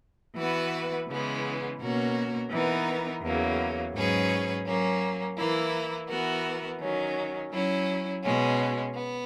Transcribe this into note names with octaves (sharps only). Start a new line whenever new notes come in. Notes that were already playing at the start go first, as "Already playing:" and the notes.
E3 B3 F#4 B4
C#3 E3 G#3 B3
B2 A#3 C#4 F#4 A#4
E3 B3 D#4 A#4
E2 C#3 F#3 A#3
G#2 F#3 C#4 G#4 B4
F#3 A#3 C#4
E3 A#3 E4
E3 B3 F#4 A#4
D#3 F#3 C#4
F#3 C#4 E4
B2 G#3 C#4
B3